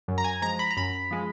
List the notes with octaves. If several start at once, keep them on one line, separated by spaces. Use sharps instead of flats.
F#2
A#5
G#5
F3 G#3 A#5
B5
A#5
F#2 B5
F3 G#3